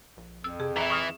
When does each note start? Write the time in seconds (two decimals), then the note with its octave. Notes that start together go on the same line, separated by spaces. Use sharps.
0.17 A#1
0.44 F2 E6
0.60 C3 G#4
0.77 D#1 E3 E4 E5 A#5
0.90 C#6 D#6 F6